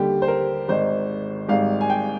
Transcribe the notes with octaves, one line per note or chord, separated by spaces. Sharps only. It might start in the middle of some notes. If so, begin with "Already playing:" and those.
Already playing: D#2 D3 G3 G4
C5
A#4
G#1 G#2 D#3 C5
G#1 G#2 G3 F5
G#5
G5